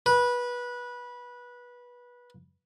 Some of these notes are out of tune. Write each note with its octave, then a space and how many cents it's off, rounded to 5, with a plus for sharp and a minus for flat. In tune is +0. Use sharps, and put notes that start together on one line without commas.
B4 -20